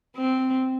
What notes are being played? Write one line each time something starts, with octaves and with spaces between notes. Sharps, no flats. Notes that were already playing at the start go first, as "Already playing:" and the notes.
C4